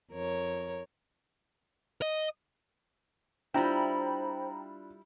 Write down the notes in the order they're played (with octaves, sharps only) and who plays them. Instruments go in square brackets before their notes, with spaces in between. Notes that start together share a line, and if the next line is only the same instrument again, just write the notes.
[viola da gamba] F2 A#4 C#5
[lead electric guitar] D#5
[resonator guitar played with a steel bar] G3 E4 [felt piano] D4 F4 [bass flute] C5 [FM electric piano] G5 A#5